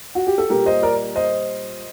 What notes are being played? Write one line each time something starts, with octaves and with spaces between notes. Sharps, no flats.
F#4
G4
A4
A#2 G3 G4 A#4
C5 D#5
A#4 D5
C5 D#5